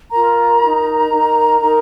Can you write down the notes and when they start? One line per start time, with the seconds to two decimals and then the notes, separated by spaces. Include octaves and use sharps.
0.11 F4 A#4 A#5
0.62 D#4 A#4
1.11 D#4 A#4
1.60 D#4 A#4